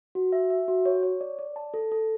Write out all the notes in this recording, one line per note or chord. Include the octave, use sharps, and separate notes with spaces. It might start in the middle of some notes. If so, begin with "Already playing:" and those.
F#4
E5
E5
F#4
C#5
C#5
D5
D5
A5
A4
A4